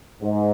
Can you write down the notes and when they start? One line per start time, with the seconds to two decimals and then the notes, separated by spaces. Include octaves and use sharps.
0.22 G#2